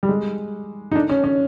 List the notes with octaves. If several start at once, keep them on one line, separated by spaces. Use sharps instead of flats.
G3
G#3
D#4
D4
C#4
C#4